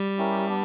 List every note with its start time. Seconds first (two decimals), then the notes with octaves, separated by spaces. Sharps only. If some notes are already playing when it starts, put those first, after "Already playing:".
Already playing: G3
0.18 C#4 E4 G4 A#4
0.48 B3 D4